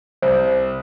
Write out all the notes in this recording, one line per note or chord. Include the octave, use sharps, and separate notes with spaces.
C2 C5